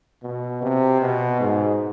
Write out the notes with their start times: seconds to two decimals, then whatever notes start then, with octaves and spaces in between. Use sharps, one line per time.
0.23 B2
0.62 C3
1.02 B2
1.41 G#2